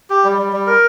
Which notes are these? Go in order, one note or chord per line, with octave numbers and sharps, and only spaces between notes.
G4
G3
G3
G3
A#4